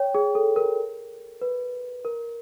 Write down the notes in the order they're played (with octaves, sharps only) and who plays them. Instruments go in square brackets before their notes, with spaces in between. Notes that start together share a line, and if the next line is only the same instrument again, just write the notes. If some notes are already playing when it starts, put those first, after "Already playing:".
Already playing: [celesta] C#5 G5
G#4
A4
A#4
B4
A#4